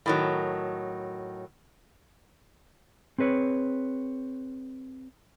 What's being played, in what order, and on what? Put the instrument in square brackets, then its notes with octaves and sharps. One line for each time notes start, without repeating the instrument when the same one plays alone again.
[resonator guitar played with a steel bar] A2 D#3 F#3
[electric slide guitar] C4 G#4 B4 C#5